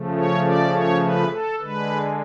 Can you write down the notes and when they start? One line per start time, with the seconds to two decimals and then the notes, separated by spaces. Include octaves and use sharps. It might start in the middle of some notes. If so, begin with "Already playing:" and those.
Already playing: C#3 F3 A3
0.14 C#5
0.43 D5
0.72 C#5
1.01 B4
1.30 A4
1.59 D3 G#3 B4